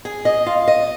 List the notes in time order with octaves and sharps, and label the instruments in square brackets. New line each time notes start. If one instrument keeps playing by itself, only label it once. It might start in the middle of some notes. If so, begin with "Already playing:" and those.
[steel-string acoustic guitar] G#4
D#5
F4
D#5